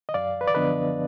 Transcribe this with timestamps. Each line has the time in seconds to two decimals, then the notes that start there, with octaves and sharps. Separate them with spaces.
0.09 D#5
0.14 F#2 D5 F5
0.41 B4
0.48 D5
0.55 D3 F3 B3 D4 B4 D#5